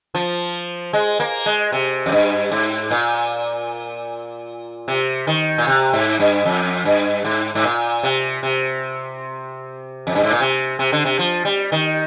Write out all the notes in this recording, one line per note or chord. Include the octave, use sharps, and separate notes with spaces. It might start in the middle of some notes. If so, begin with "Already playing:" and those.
F3
G#3
A#3
G#3
C3
F2
G2
G#2
A#2
C3
D#3
A#2
C3
G#2
G2
F2
G2
G#2
G#2
A#2
C3
C3
F2
G2
G#2
A#2
C3
C3
D3
C3
F3
G3
D#3